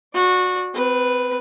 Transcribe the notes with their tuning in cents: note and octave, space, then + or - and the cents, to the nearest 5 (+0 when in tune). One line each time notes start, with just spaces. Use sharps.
F#4 -20 D5 +0
C4 -30 B4 +0